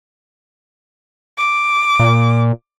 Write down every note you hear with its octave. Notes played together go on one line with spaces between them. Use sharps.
D6
A#2